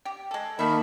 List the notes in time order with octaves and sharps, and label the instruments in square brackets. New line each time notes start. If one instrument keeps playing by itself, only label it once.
[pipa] G4
G#3 A4
[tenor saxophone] D#3 [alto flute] A#3 [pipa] A4 E5 [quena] B5